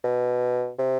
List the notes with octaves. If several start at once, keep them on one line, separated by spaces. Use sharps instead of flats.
B2
C3